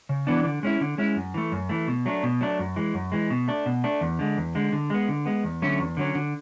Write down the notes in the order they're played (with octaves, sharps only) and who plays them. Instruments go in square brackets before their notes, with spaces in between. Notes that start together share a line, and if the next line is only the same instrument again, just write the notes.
[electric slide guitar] C#3
E3 B3 D4
D3
G#3 C#4 E4
D3
G#3 C#4 E4
F#2
E3 A3
F#2
E3 A3
B2
F#3 A3 D4
B2
F#3 A3 D4
F#2
E3 G#3
F#2
E3 G#3
B2
A3 D4
B2
A3 D4
E2
D3 G#3
E2
D3 G#3
D3
G#3 B3
D3
G#3 B3
E2
D3 F#3 A3 C#4
E2
D3 F#3 A3 C#4
D3